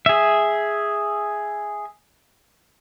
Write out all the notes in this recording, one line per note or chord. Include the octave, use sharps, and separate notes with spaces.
G#4 E5